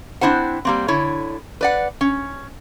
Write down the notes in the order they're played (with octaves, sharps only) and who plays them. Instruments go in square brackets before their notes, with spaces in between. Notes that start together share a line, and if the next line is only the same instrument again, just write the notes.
[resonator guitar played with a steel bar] C4 D4 E4 C5 F#5
G3 A#3 C4
D3 E4 C#5
B4 D5 F#5
C#4